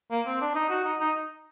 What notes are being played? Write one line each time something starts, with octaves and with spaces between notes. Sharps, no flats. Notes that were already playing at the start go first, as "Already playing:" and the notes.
A#3
C4
D4
D#4
F#4
D#4
D#4